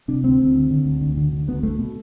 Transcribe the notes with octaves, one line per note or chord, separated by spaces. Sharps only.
C3 D4
D2 C4
D2
D3
D3
D2
D2
D3
D3
D2 B3
D2 A3
B2